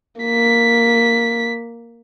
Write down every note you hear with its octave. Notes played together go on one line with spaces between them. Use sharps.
A#3 B6